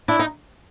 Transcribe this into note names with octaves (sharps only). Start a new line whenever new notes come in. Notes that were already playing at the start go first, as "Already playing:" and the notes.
D4 E4
D#4